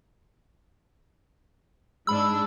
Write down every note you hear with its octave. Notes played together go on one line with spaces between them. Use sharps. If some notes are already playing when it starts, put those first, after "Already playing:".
G#2 G#3 D4 B5 E6